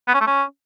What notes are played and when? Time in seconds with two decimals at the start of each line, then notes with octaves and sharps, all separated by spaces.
0.08 B3
0.14 C#4
0.20 A3
0.27 C#4